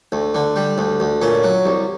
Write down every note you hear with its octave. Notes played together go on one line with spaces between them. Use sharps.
D2
D3
G3
D2
D2
A#2 C#4
F#3
C2